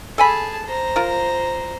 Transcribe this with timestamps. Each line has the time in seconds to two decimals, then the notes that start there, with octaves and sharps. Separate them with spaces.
0.18 G#4 A4 G#5 A5 B5
0.66 C5 A#5
0.96 F4 A#4